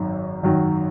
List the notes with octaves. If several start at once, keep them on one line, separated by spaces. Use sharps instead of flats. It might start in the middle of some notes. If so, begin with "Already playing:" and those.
Already playing: G#1 F#2 D#3 F#3
G#1 F#2 D#3 F#3